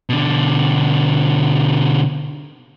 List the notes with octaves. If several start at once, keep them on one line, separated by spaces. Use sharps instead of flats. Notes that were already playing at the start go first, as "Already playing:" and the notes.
B2 D3